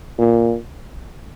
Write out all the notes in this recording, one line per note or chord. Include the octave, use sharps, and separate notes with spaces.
A#2